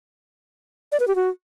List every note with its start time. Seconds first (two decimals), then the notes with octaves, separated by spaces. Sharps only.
0.92 D5
1.00 B4
1.08 G4
1.16 F#4